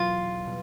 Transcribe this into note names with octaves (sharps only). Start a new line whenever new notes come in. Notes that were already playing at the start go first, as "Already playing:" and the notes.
Already playing: E2 B2 F#3 A#3 F4
B2 G3